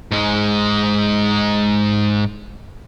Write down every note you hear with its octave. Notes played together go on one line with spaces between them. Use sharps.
G#2 G#3